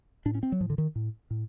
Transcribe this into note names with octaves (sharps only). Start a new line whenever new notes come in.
A2 D4
C#4
C4
F#3
A2 F3
D3
D#3
A2
A2